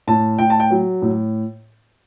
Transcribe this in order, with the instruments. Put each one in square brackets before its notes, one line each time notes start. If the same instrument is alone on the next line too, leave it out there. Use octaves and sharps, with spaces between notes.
[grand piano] A2 A5
A2 G5
A5
G5
F#3
A2